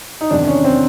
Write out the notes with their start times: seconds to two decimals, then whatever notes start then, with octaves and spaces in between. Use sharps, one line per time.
0.21 D#4
0.30 E2 C3 D#3 D4
0.48 C#4
0.65 C4